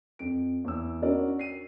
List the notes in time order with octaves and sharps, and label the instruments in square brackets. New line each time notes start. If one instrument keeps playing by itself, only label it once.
[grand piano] F2 D7
E2 E6
C#4 D4 F#4 A#4 D5
C7 D#7